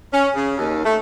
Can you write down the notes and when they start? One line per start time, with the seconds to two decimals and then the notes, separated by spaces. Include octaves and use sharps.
0.13 C#4
0.34 C#3
0.57 D#2
0.85 A3